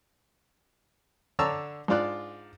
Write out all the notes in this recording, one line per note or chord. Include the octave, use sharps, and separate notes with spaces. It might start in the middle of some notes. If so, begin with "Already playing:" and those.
D3 D4 C#5 A5 A#5 E6
G#2 D4 F4 D5 F#6